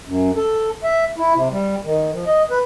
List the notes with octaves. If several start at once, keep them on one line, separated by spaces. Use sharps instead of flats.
F#2
A4
E5
E4
C3
G3
D#3
F3
D#5
B4